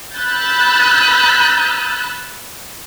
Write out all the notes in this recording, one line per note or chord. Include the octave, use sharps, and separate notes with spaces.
B5 E6 F#6 G6 A6